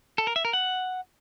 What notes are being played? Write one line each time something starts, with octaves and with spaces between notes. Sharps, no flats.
A4
A#4
E5
A#4
F#5